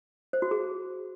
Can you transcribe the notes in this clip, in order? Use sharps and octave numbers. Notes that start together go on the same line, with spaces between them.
C5
F#4
G#4